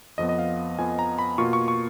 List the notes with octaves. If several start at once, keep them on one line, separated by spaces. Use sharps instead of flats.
F2 F3 B3 D#5
D#5
F5
F2 F3 B3 G#5
A#5
B5
B2 A#3 F4 C#6
C#6
C#6